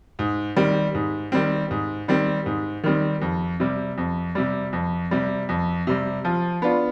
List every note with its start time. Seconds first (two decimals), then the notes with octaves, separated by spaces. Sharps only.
0.19 G#2
0.56 D#3 G3 C4
0.94 G#2
1.32 D#3 G3 C4
1.71 G#2
2.08 D#3 G3 C4
2.46 G#2
2.83 D#3 G3 C4
3.22 F2
3.60 C3 G3
3.98 F2
4.35 C3 G3
4.73 F2
5.11 C3 G3
5.49 F2
5.87 C3 G3
6.25 F3
6.62 B3 D4 F4